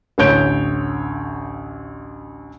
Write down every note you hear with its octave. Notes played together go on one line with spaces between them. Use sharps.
A1 D2 C#5 G6 D7